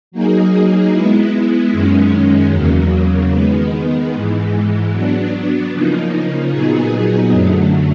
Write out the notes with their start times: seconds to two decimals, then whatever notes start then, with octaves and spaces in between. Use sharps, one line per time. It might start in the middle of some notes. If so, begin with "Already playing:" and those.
0.12 F#3 A#3 D#4 G#4
0.91 G#3 B3 E4
1.72 F#2 D#3 G#3 C#4
2.52 E2 C#3 F#3 A#3
3.31 D#3 G#3 B3
4.11 G#2 E3 G#3
4.91 F#3 B3 D4
5.72 C#3 F3 A#3 D#4
6.51 A#2 F#3 B3 D#4 G#4
7.31 F#2 D3 F#3 A3